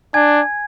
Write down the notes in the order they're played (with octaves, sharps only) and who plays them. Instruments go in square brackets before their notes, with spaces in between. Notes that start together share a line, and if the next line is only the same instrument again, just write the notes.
[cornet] D4 [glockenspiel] G#5 G#6